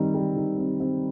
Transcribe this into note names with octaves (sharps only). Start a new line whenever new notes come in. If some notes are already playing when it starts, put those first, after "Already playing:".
Already playing: D#3 G3 C4
G3
D#3
C4
C4